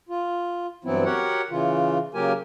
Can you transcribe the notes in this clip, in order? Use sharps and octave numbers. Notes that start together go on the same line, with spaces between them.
F4
G2 E3 F#3 B3 C4 E4
F#4 G4 A#4 C#5 F#5
C#3 E3 F4
C#3 F#3 A#3 G4 A#4 G#5